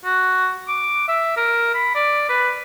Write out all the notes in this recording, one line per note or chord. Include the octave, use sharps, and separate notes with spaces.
F#4
D6
E5
A#4
B5
D5
B4